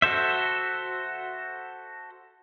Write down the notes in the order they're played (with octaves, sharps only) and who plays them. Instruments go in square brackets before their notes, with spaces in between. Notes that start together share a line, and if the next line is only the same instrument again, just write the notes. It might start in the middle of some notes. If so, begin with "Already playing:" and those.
[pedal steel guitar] F#4 A4 C5 E5